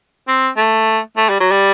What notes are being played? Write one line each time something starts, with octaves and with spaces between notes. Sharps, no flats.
C4
A3
A3
G3
F#3
G3